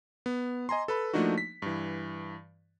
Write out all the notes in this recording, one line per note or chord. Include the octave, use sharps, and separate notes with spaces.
B3
D#5 G#5 A#5 C6
A4 B4 B5
F3 A3 A#3 D4 D#4 F#4
B6
G2 E3